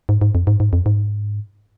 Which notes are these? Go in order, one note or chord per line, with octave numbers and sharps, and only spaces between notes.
G#2
G#2
F2
G#2
G#2
F2
G#2